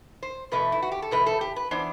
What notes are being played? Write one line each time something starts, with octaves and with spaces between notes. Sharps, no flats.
C5
E2 B2 A3 B4
E4
F#4
G4
A4
E2 B2 A3 B4
A4
G4
B4
E3 B3 D4 C5